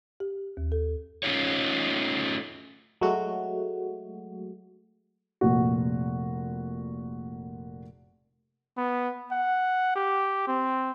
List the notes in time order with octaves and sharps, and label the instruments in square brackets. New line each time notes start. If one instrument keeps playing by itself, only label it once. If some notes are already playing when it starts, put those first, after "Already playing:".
[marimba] G4
D#2
A4
[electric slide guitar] A3 C#4 D#4 F4 C#5
[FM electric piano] F#3 G#3 A3 F#4
[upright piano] F1 A#2 F#4
[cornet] B3
F#5
G4
C4